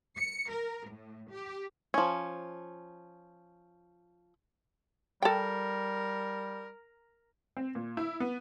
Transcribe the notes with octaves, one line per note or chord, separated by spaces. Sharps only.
C#7
A#4
A2
G4
F3 C#4
G3 A4 A#4 G5
C4
A#2
E4
B3